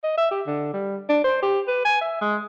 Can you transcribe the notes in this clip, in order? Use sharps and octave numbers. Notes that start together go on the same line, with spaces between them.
D#5
E5
G4
D3
G3
D4
C5
G4
B4
G#5
E5
G#3